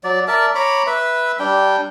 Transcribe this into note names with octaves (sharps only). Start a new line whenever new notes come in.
F#3 D5
A#4 D5 E5 A5
C#5 A#5 B5 D6
B4 E5
G3 D4 G5